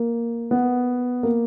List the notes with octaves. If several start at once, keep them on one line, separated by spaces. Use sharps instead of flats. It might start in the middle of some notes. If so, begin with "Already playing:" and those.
Already playing: A#3
B3
A#3